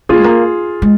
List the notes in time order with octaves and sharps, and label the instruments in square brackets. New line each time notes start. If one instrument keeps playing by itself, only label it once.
[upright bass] A#3 [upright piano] F4 G#4
[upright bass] G#3
A#3
G#3